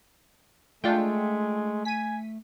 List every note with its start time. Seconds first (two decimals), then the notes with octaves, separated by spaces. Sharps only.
0.84 G#3 A3 D4 F4 G5
1.85 G#5 B6 D#7